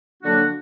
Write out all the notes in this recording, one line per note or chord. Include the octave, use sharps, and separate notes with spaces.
D3 F#3 A#3 D4 F#4